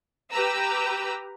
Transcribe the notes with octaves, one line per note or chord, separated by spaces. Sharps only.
G4 B4 A#5 E6